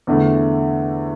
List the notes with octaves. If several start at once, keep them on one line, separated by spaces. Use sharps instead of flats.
E2 D3 A3 E4